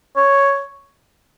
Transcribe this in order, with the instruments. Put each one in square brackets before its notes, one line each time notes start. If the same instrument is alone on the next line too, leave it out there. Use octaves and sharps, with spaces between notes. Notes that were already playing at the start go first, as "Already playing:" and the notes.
[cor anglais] C#5